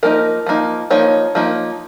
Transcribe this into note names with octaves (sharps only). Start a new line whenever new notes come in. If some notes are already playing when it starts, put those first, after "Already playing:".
F3 A#3 D#4 A#4
F3 A#3 D#4
F3 A#3 D#4 C#5
F3 A#3 D#4